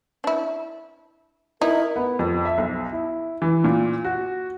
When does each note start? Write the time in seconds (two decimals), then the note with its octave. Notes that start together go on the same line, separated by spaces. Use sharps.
0.24 D4 E4
1.62 D#4 E4 A#4
1.96 B3
2.19 F2
2.45 E5
2.58 B1
2.92 E4
3.42 E3
3.64 A#2
4.05 F#4